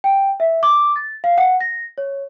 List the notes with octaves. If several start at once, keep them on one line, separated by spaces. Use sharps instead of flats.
G5
E5
D6
A6
F5
F#5
A#6
C#5